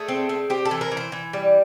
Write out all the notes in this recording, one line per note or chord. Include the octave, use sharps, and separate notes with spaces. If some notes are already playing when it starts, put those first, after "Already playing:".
Already playing: A3 G#4
C4
C4
C4 G4
A4
E3
A#4
E3
C5
E3
G3